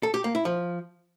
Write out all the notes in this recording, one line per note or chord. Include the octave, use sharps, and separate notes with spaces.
A4
G4
A#3
E4
F3